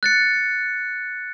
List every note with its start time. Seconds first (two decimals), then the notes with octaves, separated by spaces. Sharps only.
0.03 F#6 A6 C#7